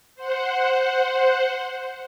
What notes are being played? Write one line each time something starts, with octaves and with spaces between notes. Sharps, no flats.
C5 F#5